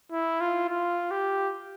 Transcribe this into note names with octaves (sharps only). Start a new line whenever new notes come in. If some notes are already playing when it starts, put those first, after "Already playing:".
E4
F4
F4
G4